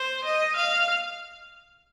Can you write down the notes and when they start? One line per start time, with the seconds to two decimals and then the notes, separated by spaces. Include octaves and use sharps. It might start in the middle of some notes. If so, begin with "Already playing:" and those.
Already playing: C5
0.25 D#5
0.56 F5